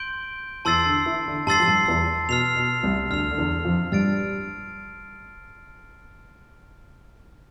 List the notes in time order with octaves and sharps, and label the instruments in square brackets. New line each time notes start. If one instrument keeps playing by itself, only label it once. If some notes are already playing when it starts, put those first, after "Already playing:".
Already playing: [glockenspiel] C6 G6 D7 G7
[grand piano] E2 E3 [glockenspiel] A5 C6 E6 A6 C7
[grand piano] D3 D4
E3 E4
D3 D4
[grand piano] G2 G3 [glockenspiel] A5 C6 E6 A6 C7
[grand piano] F3
G2 G3
E2 E3
[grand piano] B2 [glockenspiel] F6 C7 F7
[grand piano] B2
C2 C3
[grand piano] D2 D3 [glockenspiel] F6 C7 F7
[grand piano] D3
E2 E3
F2 F3
[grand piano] G2 G3 [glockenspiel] F6 A6 D7